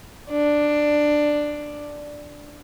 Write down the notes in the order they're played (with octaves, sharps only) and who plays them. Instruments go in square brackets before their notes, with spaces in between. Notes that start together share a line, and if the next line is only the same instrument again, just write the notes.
[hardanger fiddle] D4